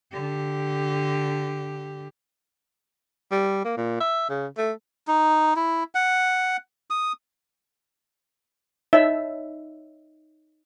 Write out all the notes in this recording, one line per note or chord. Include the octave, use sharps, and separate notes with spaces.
D3 G4
G3
A#3
A#2
E5
C#3
A3
D#4
E4
F#5
D#6
D#4 C#5 D#5 E5